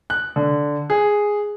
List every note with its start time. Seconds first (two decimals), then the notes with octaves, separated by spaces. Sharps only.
0.10 F#6
0.36 D3
0.90 G#4